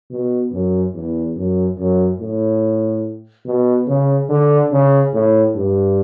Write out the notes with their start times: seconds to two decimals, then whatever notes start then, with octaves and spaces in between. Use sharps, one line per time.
0.11 B2
0.52 F#2
0.94 E2
1.36 F#2
1.78 F#2
2.20 A2
3.46 B2
3.87 C#3
4.29 D3
4.71 C#3
5.13 A2
5.55 G2